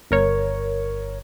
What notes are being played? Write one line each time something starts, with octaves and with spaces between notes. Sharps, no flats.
G1 A#4 C#5